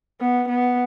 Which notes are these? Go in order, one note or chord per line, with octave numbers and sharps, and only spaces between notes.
B3
B3